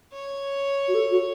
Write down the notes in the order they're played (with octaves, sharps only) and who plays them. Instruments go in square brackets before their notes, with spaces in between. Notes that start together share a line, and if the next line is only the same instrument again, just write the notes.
[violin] C#5
[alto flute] F#4
A4
F#4